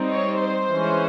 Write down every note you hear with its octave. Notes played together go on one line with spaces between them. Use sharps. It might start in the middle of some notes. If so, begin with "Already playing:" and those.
Already playing: G3 C4 D#4
C#5
C5
E3 G#3 C#4